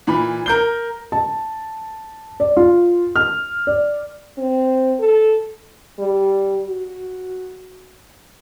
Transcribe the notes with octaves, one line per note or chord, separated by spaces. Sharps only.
A#2 E3 B5
A#4 G6 G7
A5
D5
F4
F6
D5
C4
A4
G3
F#4